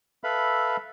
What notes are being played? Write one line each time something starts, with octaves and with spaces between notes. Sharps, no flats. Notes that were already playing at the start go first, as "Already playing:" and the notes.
A4 B4 E5 F5 B5